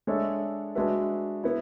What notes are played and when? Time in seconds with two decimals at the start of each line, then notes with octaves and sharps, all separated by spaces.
0.07 G#3 D4 A4 C#5 E5
0.75 G#3 D4 F#4 B4 E5
1.44 B3 E4